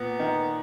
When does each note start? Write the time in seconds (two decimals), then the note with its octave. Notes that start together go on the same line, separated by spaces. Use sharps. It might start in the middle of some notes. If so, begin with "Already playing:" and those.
Already playing: A#2 B3
0.19 D#3